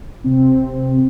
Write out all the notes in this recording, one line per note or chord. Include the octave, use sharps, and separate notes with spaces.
C3 C4